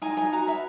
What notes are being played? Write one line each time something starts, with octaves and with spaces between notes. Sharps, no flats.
D#4 G#5
D#4 G#5
F#4 A#5
B4 E5